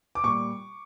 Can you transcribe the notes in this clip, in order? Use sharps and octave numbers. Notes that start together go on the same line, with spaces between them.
D6
A#2 G3 C#6